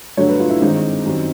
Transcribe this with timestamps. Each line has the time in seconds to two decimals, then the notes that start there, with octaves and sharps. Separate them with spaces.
0.17 G2 D3 F#3 A3 C#5
0.28 B4
0.40 F4
0.50 E4
0.61 G#1 G2 D#3 G#3 C4 D#4
1.05 F#2 D#3 G3 C4